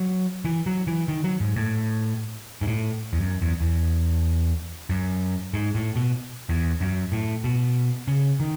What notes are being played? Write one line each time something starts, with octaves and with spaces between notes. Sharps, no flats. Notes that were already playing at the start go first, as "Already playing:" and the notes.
Already playing: F#3
E3
F#3
E3
D#3
F#3
G#2
A2
G#2
A2
E2
F#2
E2
E2
F#2
G#2
A2
B2
E2
F#2
A2
B2
C#3
D#3